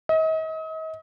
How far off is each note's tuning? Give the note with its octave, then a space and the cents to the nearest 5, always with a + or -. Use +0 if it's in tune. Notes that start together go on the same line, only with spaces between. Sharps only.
D#5 +40